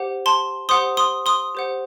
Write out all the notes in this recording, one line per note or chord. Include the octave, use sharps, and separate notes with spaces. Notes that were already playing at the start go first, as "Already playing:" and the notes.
Already playing: G4 C5 F#5
A5 C6
G4 C5 F#5 C6 D#6
C6 D#6
C6 D#6
G4 C5 F#5